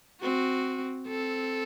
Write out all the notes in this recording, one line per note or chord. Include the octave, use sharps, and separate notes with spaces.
C4 F#4
C4 A4